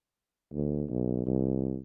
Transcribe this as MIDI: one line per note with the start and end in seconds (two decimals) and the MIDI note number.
0.54 0.84 38
0.89 1.22 35
1.26 1.77 36